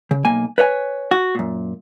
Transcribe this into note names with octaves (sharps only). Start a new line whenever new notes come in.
C#3
B1 A#3 G#5
B4 C#5 D#5 G#5
F#4
F#2 A#2